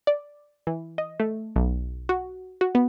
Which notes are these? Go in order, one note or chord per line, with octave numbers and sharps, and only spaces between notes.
D5
E3
D#5
A3
B1
F#4
F#4
B3